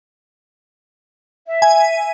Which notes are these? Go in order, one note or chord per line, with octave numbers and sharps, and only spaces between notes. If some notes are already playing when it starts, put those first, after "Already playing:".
E5
G#5